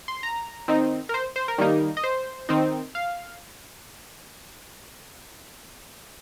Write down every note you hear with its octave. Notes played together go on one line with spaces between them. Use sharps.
C6
A#5
D#3 C4 D#4
A#4
C5
C5
A#4
D#3 G3 A#3 D#4
D#5
C5
D#3 C4 D#4
F5